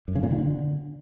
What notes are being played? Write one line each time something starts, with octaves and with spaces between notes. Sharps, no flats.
F#2
C#3
A#2
D#3
D3